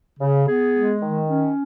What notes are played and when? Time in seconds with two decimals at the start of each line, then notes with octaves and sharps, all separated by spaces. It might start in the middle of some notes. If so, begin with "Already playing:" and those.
0.20 C#3
0.47 B3 G#4
0.75 G#3
1.02 D#3
1.30 C#4